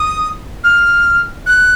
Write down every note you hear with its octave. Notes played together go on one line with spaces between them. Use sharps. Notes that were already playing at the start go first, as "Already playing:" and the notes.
Already playing: D#6
F6
F#6